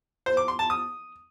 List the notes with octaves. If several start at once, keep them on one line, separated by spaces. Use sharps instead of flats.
C5
D6
C6
A5
D#6